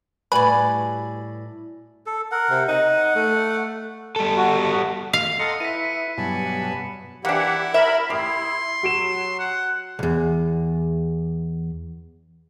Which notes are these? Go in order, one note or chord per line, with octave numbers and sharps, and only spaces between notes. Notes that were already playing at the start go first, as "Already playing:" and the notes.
A2 G3 F#4 B4 D5 G#5
A4
A#4 F#5
C3
D#4 F#5
A3
G3 A4
F#4
F5
A4 D#5 F#5 A#5 C6 C#7
E4 B4 B6 D#7
G2 B2 F#3 G#5 A5 B5
E3 A#3 D4 E4 G4 F#5
A#4 E5 B5
E4 G4 B5 C6 D#6 C7
F#3 F#4 D7 E7
F#5
B1 E2